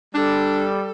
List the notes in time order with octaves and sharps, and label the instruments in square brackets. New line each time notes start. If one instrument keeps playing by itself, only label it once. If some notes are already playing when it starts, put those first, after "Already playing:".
[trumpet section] G3 [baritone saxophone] D4 [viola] A4